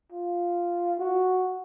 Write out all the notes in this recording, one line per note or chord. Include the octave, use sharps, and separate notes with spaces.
F4
F#4